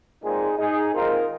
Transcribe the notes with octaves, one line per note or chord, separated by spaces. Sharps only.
A#2 G#3 C4 D#4 G#4
D#4 G#4
D#3 G#3 C4 F4 A#4